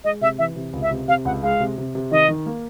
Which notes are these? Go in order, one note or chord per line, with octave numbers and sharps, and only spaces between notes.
G#3 D#5
C3 E5
E3 E5
C3
C#2
E5
C3
C3 F5
C#2 F#5
G#3 F5
C3
C3
C3
D#3 D#5
D#3
A#3